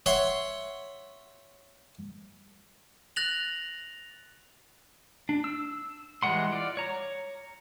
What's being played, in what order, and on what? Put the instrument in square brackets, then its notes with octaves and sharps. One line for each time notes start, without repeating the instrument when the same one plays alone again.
[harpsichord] C#5 E5 F#5 C6
[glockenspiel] F#6 A6 A#6 F7 F#7
[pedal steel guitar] D4
E6
E3 G3 G#3 F#5 C6
F4 D5
C#5 A#5